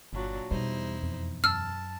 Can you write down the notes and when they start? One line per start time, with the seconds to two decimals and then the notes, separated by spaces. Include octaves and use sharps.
0.13 G1 A#2 F#3 D4
0.51 E2 B2 G3 D#4 E4 C5
1.03 F2
1.44 F#2 A5 E6 F6